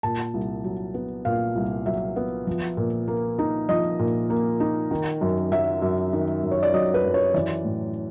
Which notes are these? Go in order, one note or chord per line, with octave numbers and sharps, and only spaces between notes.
A#2 A5
C2
F#3
B3
A#2 F5
C2
F#3 E5
B3
F3
A#2
A#3
D#4
F3 D#5
A#2
A#3
D#4
D#3
F#2
F#3 E5
F#2
D#3
F#2
C#5
D5
F#3 D#5
B4
F#2
C#5
E3 D5
A2